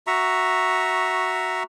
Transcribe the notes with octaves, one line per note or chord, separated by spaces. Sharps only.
F#4 E5 A#5 C#6